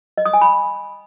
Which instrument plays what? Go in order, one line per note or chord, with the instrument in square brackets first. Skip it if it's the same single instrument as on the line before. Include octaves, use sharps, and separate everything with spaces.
[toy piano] D#5
D#6
G#5
B5